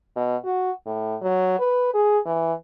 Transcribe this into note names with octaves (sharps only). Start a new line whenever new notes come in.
B2
F#4
A2
F#3
B4
G#4
E3